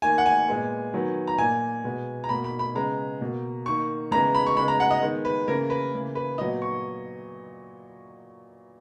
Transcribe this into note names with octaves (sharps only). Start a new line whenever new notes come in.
D#3 A#3 G#5
F#5
G#5
A#2 G#3 B3
D#3 F#3 B3
A#5
A#2 A#3 G#5
B2 G#3 B3
A#5
B2 A#3 B5
B5
B5
C#3 G#3 B3 A#5
B2 A#3
D#3 A#3 C#6
C#3 E3 G#3 B3 A#5
B5
C#6
C#3 G#3 B3 B5
A#5
F#5
D#5
D#3 G#3 B3
B4
C#3 E3 A#3 A#4
B4
C#3 E3 A#3
B4
A#2 F#3 B3 D#5
C#6